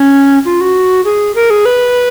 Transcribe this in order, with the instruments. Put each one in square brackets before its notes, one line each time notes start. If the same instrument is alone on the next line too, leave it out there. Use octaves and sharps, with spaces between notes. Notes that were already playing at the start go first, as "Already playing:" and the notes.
Already playing: [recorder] C#4
F4
F#4
G#4
A#4
G#4
B4